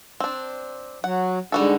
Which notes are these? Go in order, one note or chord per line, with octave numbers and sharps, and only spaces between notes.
C4 D4
F#3 F#5
G#2 D3 G3 F#4 A4